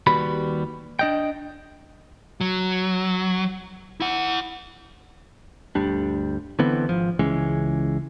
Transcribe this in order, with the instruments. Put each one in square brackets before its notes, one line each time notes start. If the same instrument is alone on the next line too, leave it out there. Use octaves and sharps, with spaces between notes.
[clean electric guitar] D#2 G3 F#4 B4 B5
D4 D#5 G5
[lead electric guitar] F#3
E4 F#5
[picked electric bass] G1 D2 G3 D4
D3 E3 B3 C4
G#1 F3
C#2 E3 G#3 C#4